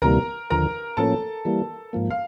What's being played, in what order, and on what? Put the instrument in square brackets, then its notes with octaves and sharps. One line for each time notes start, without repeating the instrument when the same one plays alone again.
[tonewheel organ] D2 C3 E3 G3 A#3 [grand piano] A#4 A#5
[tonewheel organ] D#2 D3 F3 [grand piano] A#4 A#5
[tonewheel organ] A2 F3 A#3 C#4 [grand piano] A4 A5
[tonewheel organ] E3 G3 A#3
G#2 F3 A#3
[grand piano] F5